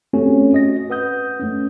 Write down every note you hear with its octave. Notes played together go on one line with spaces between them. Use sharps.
A3 C4 C#4 F#4 G4 A4
F#4 D#5 A#6
B4 F#5 D#6 G6
A3 C#4